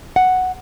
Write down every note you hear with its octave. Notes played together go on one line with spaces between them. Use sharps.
F#5